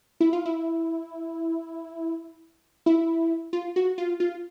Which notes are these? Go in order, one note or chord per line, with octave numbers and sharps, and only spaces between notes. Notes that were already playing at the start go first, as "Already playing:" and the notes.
E4
F4
E4
E4
F4
F#4
F4
F4